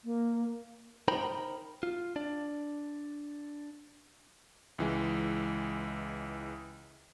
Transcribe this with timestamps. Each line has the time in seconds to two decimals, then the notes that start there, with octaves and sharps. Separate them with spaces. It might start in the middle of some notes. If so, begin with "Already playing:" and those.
0.05 A#3
1.08 D#4 A#4 C5 G5 A#5 B5
1.83 F4
2.16 D4 D5
4.79 C#2 E3 G#3